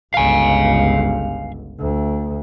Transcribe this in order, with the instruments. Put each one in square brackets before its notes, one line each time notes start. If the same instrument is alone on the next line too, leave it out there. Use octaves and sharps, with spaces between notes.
[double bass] G1 C#2 [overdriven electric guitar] F5 G#5
[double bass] D2